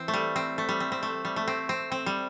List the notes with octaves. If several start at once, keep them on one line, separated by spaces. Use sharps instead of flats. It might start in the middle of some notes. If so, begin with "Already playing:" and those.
Already playing: E3 C4
A3
G3
C4
A3
G3
C4
C4
A3
G3
A3
C4
C4
C4
G3